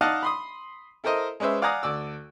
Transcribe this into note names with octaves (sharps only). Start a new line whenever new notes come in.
D#4 D5 D#5 F5 F#5 A5
B5 C6 D#6
E4 A4 A#4 C5 D#5
G#3 C#4 B4 C5 E5
D5 F5 F#5 G#5 A#5 D#6
D2 D5 E6